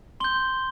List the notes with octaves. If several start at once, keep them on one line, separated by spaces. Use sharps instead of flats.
C6 G6 G7